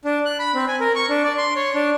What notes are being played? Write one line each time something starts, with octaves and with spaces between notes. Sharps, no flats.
D4
F#6
B5
C4
G#5
A#4
C#6
D4
D5
C6
C#5
D4